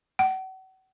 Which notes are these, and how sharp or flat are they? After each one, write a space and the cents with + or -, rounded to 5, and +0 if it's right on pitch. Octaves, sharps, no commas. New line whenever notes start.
F#5 +40